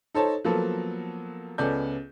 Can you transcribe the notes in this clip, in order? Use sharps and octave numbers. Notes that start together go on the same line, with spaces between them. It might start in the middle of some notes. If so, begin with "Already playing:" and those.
D#4 A4 C5 C#5 A5
F3 F#3 A#3 B3 A4 B4
C#2 B3 C#4 A4 D5 G6